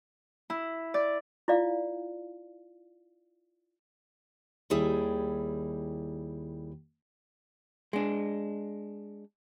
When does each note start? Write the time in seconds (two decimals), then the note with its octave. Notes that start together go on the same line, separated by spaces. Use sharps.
0.50 E4
0.94 D5
1.48 E4 F4 D5 F5
4.70 D#2 G3 E4 G#4 G5
7.93 G#3 D4